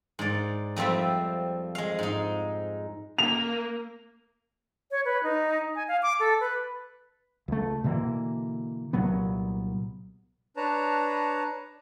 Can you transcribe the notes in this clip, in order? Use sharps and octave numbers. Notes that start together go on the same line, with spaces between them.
G#2 D5
F2 F3 G3 C4 E5
G#3 F5
G#2 D#4
A#3 F7
C#5
B4
D#4
G#5
F5
D6
A4
B4
C#2 A3
B2 D3 E3 A#3
C2 A#2 F#3 B3
D4 B4 C#5 A5 A#5